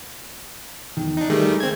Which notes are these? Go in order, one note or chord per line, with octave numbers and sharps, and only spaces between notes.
E2 D#3
D4 D#4
D#3 G3 A3 G#4
C4 G#6